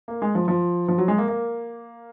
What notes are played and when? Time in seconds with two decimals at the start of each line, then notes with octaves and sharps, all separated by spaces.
0.08 A#3
0.22 G#3
0.35 F3
0.48 F3
0.88 F3
0.98 F#3
1.08 G#3
1.18 A#3
1.28 A#3